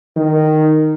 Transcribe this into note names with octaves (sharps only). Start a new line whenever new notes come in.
D#3